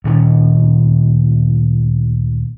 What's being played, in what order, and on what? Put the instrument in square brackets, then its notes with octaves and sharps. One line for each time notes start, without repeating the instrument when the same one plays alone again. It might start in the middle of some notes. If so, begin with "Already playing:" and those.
[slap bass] D2 A#2 D#3 C#4